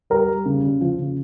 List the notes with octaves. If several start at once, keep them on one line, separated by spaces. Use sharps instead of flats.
G3 A#4
G3
C#3
C#3
F3
C#3